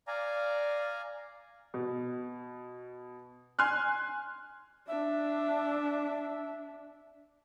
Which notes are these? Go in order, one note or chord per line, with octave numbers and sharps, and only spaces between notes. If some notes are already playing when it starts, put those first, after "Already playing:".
D5 F5 G#5 A#5
B2
G#5 C6 F6 F#6
D4 E5